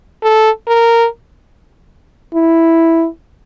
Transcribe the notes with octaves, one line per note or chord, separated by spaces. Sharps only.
A4
A#4
E4